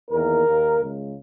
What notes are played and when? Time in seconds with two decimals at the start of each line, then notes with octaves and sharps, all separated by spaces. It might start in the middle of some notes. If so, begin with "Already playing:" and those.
0.10 E2 D#3 A#3 A#4
0.46 D#2 D#3 A#3
0.80 C#2 C#3 G#3